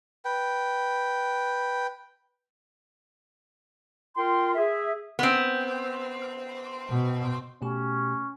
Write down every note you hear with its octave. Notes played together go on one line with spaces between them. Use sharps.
B4 G5
F4 A#4 G5 C6
G#4 E5
B3 C4
B2
B2 A3 C#4 G4